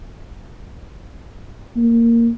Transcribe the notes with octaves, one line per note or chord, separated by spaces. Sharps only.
A#3